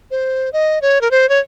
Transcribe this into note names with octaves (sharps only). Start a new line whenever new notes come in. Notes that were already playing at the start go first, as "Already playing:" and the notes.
C5
D#5
C#5
A#4
C5
C#5